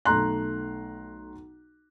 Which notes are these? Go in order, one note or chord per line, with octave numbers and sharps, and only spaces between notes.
B1 A3 A#5 C6 F#6